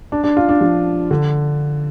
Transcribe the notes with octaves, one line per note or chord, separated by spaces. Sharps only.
D4
D4
F4
D4
F3
D3